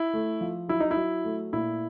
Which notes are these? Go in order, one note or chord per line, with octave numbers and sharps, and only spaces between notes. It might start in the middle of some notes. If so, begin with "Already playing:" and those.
Already playing: E4
A3
F3
F#3 E4
D#4
E4
F#3
A3
A#2 E4